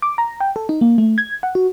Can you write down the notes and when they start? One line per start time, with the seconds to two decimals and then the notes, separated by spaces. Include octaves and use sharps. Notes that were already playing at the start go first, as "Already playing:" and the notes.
0.02 D6
0.18 A#5
0.40 G5
0.56 A4
0.69 D#4
0.81 A#3
0.98 A3
1.18 G#6
1.43 F#5
1.55 F#4